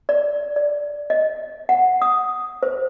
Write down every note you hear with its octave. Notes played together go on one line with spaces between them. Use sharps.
D5
D5
D#5
F#5
D#6
C5